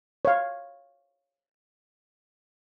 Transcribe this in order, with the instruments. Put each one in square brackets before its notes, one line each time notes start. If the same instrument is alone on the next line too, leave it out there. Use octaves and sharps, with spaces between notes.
[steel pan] C#5 F5